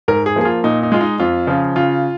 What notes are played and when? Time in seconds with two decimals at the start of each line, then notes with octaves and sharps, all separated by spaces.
0.08 G#2 A#4
0.26 G#4
0.36 F3 A#3 G#4
0.45 F4
0.64 A#2 D#4
0.83 D#4
0.92 G#3 F4
1.01 D#4
1.20 F2 F4
1.47 C#3 F3
1.76 C#3 F4